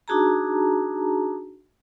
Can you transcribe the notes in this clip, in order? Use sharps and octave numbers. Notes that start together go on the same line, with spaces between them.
D4 D#4 F#4 G#4 A5 A#5